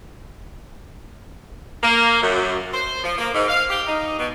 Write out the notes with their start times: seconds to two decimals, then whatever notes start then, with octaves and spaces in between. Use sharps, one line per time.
1.83 A#3
2.23 F#2
2.72 C5
3.03 F3
3.18 A#3
3.34 G#2
3.48 F5
3.70 G4
3.87 D#4
4.18 B2